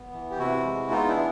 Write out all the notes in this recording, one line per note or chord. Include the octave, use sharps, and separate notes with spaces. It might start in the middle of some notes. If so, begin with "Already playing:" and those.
Already playing: B3
E3
G4
C3 E4 F#4
G#3
B3 D#4 F4
D4 E4
E3